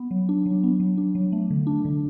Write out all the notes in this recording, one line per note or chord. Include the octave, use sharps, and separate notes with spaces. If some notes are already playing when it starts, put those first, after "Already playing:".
Already playing: B3
F#3
D4
F#3
B3
F#3
D4
F#3
A3
D3
D4
D3